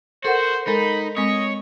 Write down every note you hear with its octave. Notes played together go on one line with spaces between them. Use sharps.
F#4 A4 A#4 C5 F#5
G#3 D#4 A4 A#4 B5
G#3 C4 C#5 D#5